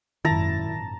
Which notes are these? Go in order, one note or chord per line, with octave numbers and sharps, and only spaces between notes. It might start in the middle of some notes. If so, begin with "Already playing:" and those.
G#1 F#2 A#2 D#3 E4 A5 A#5